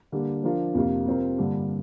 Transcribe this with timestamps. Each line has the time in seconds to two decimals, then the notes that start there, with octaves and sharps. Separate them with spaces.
0.12 D3 G3 A#3 D4
0.44 F3 D4 F4 A#4
0.74 F2 C3 F3 A#3 F4
1.06 C3 G3 C4 F4 A#4
1.38 G2 D3 G3 A#3 D4